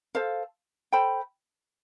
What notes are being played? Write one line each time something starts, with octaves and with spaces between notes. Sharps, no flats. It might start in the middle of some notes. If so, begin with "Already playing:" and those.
A4 C5 F5
A4 C5 G5 B5